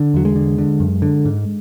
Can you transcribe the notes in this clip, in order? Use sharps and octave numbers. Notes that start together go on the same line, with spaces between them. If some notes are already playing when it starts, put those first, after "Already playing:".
Already playing: D3
E2 F#3
G#3
D3
D3
F#2
D3
G#2